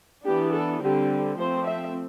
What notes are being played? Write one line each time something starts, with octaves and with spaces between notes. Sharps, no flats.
E3 B3 D4 G4
A4
D3 G3 C4 G4
F3 A3 C4 C5
E5